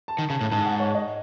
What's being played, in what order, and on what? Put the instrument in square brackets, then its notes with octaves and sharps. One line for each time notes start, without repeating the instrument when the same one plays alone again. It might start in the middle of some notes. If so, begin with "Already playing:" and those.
[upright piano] A5
[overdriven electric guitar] D#3
[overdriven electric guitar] C#3 [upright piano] A5
[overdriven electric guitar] A2
[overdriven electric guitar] G#2 [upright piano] A5
[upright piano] F#5
C#5
D#5